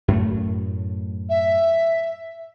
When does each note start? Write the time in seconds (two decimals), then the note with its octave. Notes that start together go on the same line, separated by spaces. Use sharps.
0.08 F#2 A2 A3
1.29 E5